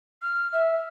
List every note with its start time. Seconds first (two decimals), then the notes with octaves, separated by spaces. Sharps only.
0.22 F6
0.53 E5